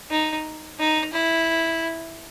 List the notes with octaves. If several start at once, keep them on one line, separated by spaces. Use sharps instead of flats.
D#4
D#4
E4